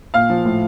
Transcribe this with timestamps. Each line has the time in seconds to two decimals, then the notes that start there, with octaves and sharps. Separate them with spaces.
0.14 A#2 F5 F6
0.30 F3
0.45 A2